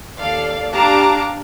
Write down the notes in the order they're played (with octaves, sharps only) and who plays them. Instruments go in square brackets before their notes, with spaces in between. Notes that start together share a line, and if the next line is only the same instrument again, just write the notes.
[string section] D#2 A4 D5 F5
D4 G4 F5 A5 A#5 D6